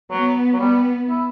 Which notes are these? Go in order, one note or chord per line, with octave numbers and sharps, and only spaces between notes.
F#3 B3
F#3
G3 B3
E4